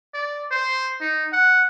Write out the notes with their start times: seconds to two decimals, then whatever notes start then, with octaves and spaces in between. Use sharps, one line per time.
0.14 D5
0.52 C5
1.01 D#4
1.33 F#5